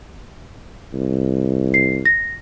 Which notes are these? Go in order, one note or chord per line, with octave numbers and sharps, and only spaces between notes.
C2
C7
A#6